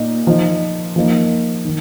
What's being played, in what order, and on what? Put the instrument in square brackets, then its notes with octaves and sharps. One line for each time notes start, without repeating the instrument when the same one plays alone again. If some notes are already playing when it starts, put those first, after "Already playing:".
Already playing: [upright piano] A#2 A#3 D#4
F3 D#4
F3 A#3 D#4
D#3